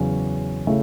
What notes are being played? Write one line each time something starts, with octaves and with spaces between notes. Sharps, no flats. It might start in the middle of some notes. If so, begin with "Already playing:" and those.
Already playing: E2 C#3 F#3 C#4
C#3 A3 E4